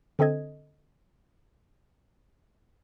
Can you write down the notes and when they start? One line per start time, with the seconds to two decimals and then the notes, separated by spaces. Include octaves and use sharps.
0.19 D3 C4 A4 D#5 G#6